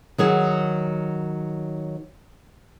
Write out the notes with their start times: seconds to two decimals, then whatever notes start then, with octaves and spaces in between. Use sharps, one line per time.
0.18 D#3 F#3 G#4